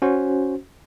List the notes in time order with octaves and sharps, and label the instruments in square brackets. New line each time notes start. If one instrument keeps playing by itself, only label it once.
[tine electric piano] C#4 F#4 C5